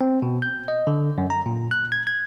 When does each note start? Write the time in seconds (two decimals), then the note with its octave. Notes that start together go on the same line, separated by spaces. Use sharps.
0.01 C4
0.22 B2
0.42 G6
0.68 D#5
0.87 D3
1.18 F#2
1.30 A#5
1.46 A#2
1.71 F#6
1.92 G#6
2.07 G#6